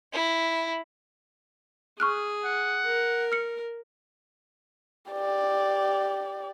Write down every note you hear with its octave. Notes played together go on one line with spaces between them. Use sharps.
E4
G#4 C#6 F6 F#6
F#5
A#4
F6 C#7
G4 D5